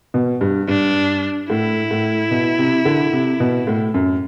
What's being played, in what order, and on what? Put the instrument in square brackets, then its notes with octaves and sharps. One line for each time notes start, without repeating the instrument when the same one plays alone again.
[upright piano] B2
G2
[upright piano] G2 [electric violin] D4
[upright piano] A2 [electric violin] E4
[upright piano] A2
B2
C3
D3
C3
B2
A2
F#2